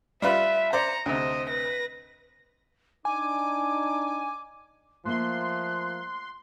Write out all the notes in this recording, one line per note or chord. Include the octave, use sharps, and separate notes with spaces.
G3 F4 B4 E5
C5 D5 A#5 C#7
D2 C3 C5 D#5
B4 A#6
D4 D#4 G#5 D6
F3 A3 A#3 E5 C6 F#6